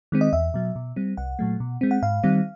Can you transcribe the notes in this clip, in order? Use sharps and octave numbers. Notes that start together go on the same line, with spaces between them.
D#3 G#3 C4
D#5
E2 E5
B2 F#3
B2
G3 C4
C2 F#5
A#2 F#3 A3
B2
G#3 C4
F#5
G#2 F5
D#3 G3 C4